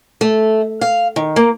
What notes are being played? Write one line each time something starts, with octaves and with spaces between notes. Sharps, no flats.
A3
F5
D#3
A#3